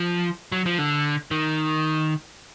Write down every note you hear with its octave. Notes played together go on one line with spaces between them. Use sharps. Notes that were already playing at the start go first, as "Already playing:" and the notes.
Already playing: F3
F#3
F3
D3
D#3